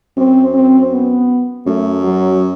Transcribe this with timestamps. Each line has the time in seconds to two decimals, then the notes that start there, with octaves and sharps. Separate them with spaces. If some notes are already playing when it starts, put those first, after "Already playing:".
0.17 F#2 C4
0.54 C4
0.92 B3
1.66 F#2 A3
2.04 F#3